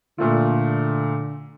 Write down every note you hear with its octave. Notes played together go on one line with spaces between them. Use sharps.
A#2 D3 A3 F4